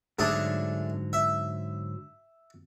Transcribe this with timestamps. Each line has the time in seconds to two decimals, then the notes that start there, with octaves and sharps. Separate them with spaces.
0.19 G#2 D3 F#3 A3 D4 G#4
1.13 E5